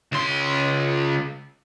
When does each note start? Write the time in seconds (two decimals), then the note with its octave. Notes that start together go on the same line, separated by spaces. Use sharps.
0.12 C#2 C6